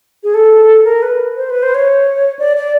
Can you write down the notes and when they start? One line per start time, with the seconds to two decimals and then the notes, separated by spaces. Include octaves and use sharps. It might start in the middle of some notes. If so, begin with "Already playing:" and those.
0.24 G#4
0.34 A4
0.85 A#4
1.02 B4
1.36 C5
1.50 B4
1.63 C5
1.75 C#5
2.39 D5
2.56 D5